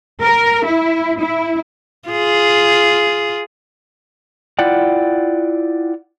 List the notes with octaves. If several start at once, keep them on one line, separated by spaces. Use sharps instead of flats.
A#4
E4
E4
F4 G#4
E4 F4 D5 F#5 G5